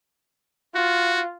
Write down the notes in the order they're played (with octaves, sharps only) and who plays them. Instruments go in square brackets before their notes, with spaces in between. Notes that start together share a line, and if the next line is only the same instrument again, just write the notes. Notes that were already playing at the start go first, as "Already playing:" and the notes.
[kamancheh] F4 [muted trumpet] F#4